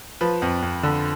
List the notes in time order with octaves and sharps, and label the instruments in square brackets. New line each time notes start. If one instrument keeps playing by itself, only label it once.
[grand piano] F3 B4
F2
F2
D3